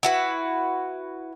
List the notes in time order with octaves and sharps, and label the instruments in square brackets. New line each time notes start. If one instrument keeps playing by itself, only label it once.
[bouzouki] E4 F#4 B4